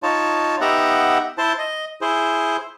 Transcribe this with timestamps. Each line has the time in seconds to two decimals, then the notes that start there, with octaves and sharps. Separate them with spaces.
0.03 D#4 F4 C#5 A5
0.61 B3 D#4 G4 E5 F#5 A#5
1.38 E4 C5 A5
1.59 D#5
2.01 E4 G#4 C5